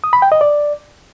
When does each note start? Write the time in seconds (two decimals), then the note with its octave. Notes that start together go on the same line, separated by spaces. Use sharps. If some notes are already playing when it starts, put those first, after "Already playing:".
0.04 D#6
0.13 B5
0.22 G5
0.32 D#5
0.41 D5